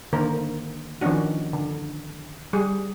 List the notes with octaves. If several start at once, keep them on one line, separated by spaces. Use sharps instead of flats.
D3 D#3 A#3 A#4 C5
D#3 F3 B3 C#4 D4 F#4
D3
G3 G#4